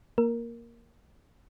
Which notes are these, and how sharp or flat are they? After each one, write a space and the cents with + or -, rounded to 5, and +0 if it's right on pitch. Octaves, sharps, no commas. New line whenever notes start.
A#3 +0 A#4 +0